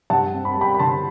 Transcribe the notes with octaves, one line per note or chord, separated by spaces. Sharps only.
G2 F#5 A5
C4
B5
A5
G3 G5 B5
B5
D3 A5 C6